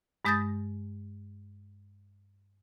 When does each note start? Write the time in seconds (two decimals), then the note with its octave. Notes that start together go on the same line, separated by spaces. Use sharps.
0.25 G2 G#3 D#6 G6 A6 A#6